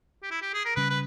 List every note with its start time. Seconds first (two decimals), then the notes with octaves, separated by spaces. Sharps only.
0.23 G4
0.31 E4
0.42 G4
0.54 G#4
0.65 A#4
0.76 C#3 G3 C#4 B4
0.90 B4